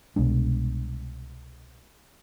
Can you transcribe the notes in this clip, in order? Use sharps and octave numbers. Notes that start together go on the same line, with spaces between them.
C2 B2 G#3 D4